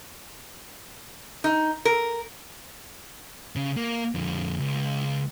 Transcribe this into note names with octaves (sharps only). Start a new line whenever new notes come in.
D#4
A#4
C#3
A#3
F2 D3
C#2